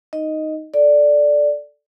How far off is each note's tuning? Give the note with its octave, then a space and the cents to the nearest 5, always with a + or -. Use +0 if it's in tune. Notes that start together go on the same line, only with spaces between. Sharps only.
D#4 +0 D#5 +0
A4 +0 D5 +0